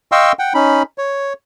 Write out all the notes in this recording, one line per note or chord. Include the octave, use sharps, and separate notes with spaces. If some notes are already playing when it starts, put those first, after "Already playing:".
D#5 F5 G5 C6 C#6 E6
F#5 G5
C#4 D#4 B5
C#5